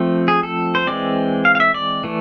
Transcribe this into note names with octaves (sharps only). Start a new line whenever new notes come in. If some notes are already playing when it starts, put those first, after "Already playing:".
Already playing: F3 A3 C4
G#4
A4
C5
E3 G#3 C4 D5
F5
F5
E5
D5
E3 A3